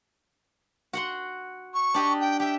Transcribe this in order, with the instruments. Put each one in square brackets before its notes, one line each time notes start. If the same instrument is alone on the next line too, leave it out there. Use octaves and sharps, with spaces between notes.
[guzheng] F#4 F#5 C6
[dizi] C#6
[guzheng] D4 G4 D#5
[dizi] G5
[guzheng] G4 E5 [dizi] G5